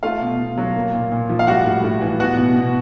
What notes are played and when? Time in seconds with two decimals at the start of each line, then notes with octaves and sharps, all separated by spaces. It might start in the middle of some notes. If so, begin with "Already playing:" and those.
0.03 A3 F4 F5
0.21 B2
0.39 B2
0.58 F#3
0.75 A#3
0.94 A#2
1.12 A#2
1.29 F3
1.39 F5
1.47 G3 F#4 F#5
1.66 A2
1.84 A2
2.01 E3
2.20 B3 F#4 F#5
2.37 B2
2.56 B2